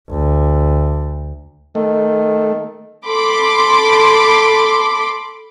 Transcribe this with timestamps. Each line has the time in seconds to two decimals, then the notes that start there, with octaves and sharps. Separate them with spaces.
0.10 D2
1.75 D#3 A3
3.07 A4 B5 C6 D6